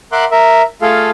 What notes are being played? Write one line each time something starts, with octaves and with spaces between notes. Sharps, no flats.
A#4 E5 F#5 C6 D6 F#6
A#4 E5
A3 F4 G#4 A4 F5